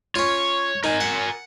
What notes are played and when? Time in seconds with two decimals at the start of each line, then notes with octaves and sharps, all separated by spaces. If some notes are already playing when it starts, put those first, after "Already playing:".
0.15 C#4 F4 C#5
0.84 D#4 A#4 G#5
1.01 F#5